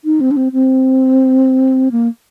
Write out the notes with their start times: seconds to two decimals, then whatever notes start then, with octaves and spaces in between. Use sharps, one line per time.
0.05 D#4
0.21 C4
0.31 D4
0.37 C4
0.53 C4
1.92 A#3